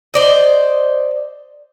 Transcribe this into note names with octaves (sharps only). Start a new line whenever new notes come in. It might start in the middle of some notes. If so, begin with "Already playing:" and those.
C5 D5 D#5